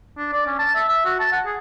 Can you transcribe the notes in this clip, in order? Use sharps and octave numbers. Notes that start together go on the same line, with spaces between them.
D4
D5
C#4
A5
E5
E5
F#4
A5
F#5
G#4